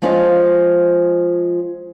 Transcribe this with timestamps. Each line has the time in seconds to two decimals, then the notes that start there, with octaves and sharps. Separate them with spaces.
0.02 F3 G#3 C#4 F4 C5 D#5